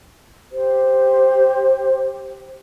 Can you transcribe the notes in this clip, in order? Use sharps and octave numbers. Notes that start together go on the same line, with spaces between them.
G4 C5